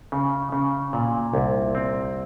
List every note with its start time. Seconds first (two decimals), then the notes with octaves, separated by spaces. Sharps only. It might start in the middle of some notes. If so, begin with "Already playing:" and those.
0.12 C#3
0.52 C#3
0.93 A#2
1.33 C2
1.75 C4